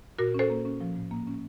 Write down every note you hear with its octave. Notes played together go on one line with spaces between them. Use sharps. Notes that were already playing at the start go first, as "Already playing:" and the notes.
A#2 F#4 A#4
C#4 A4 C5
A#3
C#4
F3
A2
A#3
C#4